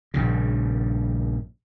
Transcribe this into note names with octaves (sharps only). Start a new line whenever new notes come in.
A#1 G2 C#3